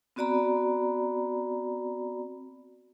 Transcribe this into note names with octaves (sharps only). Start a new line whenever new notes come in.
B3 C4 F#4 D5 A#5 B5